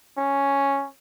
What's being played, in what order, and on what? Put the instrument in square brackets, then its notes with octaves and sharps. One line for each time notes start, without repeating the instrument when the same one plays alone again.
[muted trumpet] C#4